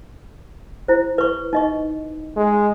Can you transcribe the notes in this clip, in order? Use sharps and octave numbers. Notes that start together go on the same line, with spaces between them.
E4 C5
B4 C#6
D#4 D#5 C#6
G#3